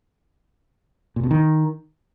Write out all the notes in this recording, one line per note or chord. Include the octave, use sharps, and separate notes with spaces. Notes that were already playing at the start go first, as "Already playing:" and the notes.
A#2
B2
D#3